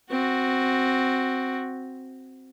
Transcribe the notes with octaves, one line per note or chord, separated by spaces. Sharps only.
C4 F#4